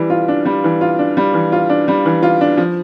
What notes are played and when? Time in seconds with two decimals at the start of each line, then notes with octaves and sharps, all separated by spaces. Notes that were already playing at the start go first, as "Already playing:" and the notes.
Already playing: E3 G3
0.10 F4
0.28 D4
0.45 G3
0.64 E3
0.81 F4
0.99 D4
1.17 G3
1.34 E3
1.52 F4
1.69 D4
1.88 G3
2.06 E3
2.23 F4
2.41 D4
2.57 F3